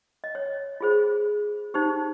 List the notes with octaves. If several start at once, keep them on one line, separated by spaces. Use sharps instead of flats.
D#5
C#5
F4 G#4 C5
D#4 G4 C5